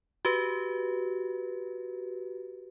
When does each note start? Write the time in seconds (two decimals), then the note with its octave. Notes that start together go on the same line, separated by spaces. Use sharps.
0.25 F#4 G4 B4